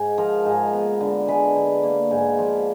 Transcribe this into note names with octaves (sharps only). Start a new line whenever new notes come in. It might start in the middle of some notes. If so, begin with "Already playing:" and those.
Already playing: G#2
F3 A#4
G#2
B3
D3
G#3 B4
D3
A#3
G#2
F3 D5